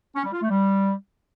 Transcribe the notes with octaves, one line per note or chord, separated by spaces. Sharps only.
C#4
G3
F4
A3
G3